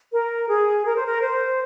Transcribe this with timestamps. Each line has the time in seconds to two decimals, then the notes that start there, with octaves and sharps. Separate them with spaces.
0.11 A#4
0.48 G#4
0.85 A#4
0.95 C5
1.06 A#4
1.21 C5